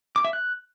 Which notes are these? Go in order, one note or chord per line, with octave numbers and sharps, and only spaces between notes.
D6
E5
F#6